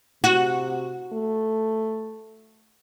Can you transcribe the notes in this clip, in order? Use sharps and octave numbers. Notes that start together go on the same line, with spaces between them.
C3 F#4
A3